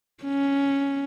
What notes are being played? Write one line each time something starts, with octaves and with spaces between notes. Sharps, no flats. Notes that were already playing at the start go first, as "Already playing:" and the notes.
C#4